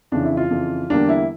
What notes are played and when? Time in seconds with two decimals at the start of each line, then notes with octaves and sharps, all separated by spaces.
0.12 F2 C#3 E3 D4
0.24 E4
0.37 F4
0.50 F2 C#3 E3
0.90 E2 D3 G3 A#3 D4
1.09 E4